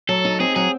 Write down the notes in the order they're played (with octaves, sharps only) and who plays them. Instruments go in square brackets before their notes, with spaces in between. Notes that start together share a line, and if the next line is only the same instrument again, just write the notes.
[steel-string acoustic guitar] F#3 [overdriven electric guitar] A4
[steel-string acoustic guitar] D#4
[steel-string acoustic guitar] C4 [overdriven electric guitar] G#4
[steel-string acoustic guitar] F#3 [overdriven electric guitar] G#4